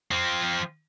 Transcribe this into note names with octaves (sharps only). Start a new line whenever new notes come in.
F3 C4